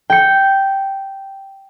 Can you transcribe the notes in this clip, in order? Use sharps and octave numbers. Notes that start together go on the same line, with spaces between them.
G5 C#7